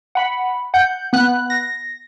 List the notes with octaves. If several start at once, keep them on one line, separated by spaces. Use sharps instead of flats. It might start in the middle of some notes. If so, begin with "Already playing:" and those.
F#5 B5
F#5 G6
B3 F#6
A#6